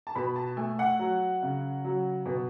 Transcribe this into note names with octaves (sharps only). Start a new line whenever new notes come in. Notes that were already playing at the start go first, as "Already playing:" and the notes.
A5
B2 B5
A5
A3 G#5
F#5
F#3
C#3
F#3
B2